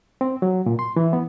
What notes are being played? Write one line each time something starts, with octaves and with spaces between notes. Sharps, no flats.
C4
F#3
A#2
C6
E3
B3